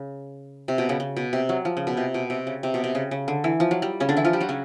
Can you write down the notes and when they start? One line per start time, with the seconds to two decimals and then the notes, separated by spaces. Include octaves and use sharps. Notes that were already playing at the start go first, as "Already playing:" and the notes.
Already playing: C#3
0.68 C3
0.78 B2
0.89 C#3
1.00 C#3
1.17 B2
1.33 C3
1.49 F#3
1.65 F3
1.77 C#3
1.87 B2
1.97 C3
2.14 B2
2.30 C3
2.47 C#3
2.63 C3
2.74 B2
2.84 C3
2.95 C#3
3.11 C#3
3.28 D3
3.44 E3
3.60 F3
3.71 F#3
3.82 G3
4.00 C#3 C#4
4.09 D3 D4
4.17 E3 E4
4.25 F3 F4
4.33 G3 G4
4.40 F#3 F#4
4.49 C#3 C#4